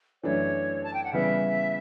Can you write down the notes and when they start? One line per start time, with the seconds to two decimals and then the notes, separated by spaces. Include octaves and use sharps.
0.23 F#2 E3 A3 D4 C#5
0.84 A5
0.94 G5
1.04 F#5
1.13 C#3 E3 G3 B3 E5